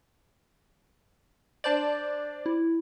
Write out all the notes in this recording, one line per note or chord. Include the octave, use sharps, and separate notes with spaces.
D4 C5 D5 A5 G6 A6
E4